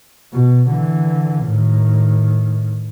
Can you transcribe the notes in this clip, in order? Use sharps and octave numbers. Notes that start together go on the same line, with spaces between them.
B2
D3 E3
A2 D#3